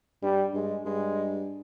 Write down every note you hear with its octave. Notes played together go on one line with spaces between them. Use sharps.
G2 G3
G2 G#3
G2 G#3